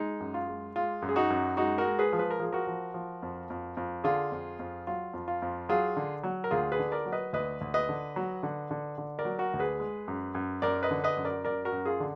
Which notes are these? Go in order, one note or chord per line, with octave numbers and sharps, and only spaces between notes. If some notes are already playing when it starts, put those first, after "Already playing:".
Already playing: G#3 D#4
F#2
F4
G#3
G#3 F4
F#2
G#4
D#4 F#4
F#2
G#3 D#4 F#4
F#4 A#4
G#3
G#4 B4
F3
B4
A#4
F3 G#4
F#4 A#4
F3
F3
F2
F2
F2
D3 F4 G#4
F2
F2
F#3 F4
F2
F4
F2
F#3 F4 G#4
D3
F#3
A#4
D2 F4 G#4
G#4 B4
D3
A#4 D5
F#3
B4 D#5
D2 B4 D#5
D2
B4 D#5
D3
F#3
D3
D3
D3
A#4 D5
F#3
F#4 A#4
D2
G#4 B4
G#3
F#2
F#2
F#2 A#4 D5
B4 D#5
D3
B4 D#5
F#2
A#4 D5
F#2 A#4 D5
F#4 A#4
F#2
F4 G#4
D3